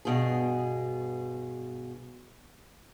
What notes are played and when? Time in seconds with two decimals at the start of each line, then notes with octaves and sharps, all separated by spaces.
0.05 G2 B2 G#4